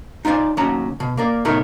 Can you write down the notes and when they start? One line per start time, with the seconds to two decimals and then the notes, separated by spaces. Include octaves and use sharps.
0.25 D#4 F4 C5 D5 G#5
0.57 D#2 F#3 C#4 F#5 A5 A#5
1.00 B2
1.17 A#3 A#4 D5
1.45 C2 A2 A3 B3 D#4 A#4